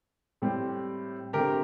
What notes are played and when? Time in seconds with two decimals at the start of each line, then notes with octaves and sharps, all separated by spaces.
0.42 A2 G3 C4
1.33 D3 A3 C4 G4 A#4